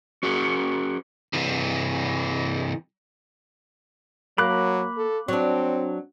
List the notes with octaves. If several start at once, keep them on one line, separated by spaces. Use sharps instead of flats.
C#4 F#4 G#4 A#4
C3 E3
F#3 A#3 B5 D6 F#6
A4
F#3 C4 D4